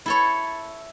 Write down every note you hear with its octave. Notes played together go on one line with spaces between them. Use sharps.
E4 A4 C#5